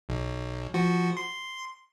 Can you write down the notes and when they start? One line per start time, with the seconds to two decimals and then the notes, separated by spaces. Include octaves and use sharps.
0.09 B1
0.74 F3 F#4
1.17 C6